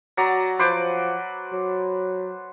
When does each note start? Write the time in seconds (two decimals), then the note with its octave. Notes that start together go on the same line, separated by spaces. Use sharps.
0.17 F#3 D5 A#5
0.59 F3 B4 C5 D6
1.52 F#3